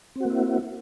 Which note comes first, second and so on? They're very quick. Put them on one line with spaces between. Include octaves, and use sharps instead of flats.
C4 F#4 A#3 E4